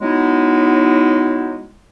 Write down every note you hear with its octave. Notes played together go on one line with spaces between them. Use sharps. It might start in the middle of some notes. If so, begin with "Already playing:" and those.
F#3 G#3 B3 D#4 E4